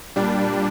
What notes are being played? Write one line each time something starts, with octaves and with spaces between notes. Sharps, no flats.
A#2 G3 D4